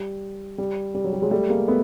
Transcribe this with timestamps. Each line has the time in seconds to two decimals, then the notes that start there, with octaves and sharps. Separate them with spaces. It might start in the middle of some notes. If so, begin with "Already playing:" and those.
Already playing: G3
0.58 G3
0.95 G3
1.04 F#3
1.13 G3
1.22 F#3 G#3
1.31 G3 A3
1.50 G#3 A#3
1.68 A3 B3